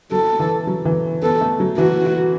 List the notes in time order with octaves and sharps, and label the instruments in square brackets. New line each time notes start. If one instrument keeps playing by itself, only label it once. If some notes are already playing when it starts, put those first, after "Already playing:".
[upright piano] F#3 [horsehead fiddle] A4
[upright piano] E3
F#3
E3
[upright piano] B3 [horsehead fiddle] A4
[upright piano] A3
F#3
[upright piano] E3 [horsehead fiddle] F#4